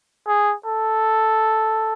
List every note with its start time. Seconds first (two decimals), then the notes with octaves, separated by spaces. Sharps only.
0.27 G#4
0.66 A4